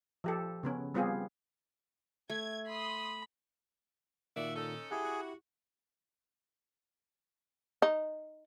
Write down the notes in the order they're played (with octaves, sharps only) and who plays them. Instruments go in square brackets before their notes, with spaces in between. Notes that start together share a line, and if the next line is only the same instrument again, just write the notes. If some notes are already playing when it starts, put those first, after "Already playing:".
[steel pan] F3 G4 A4
C#3 B3 C#4
G3 B3 C4 F4 G4 G#4
[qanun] A3 [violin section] G#6
[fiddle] B5 [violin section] C6 D#6
[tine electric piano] A#2 D#3 A#3 [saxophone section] F#4 D5 E5
[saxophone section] C#4 D#4 A4
[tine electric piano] E4 G4 F#5 [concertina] G#4
[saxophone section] F#4
[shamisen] D#4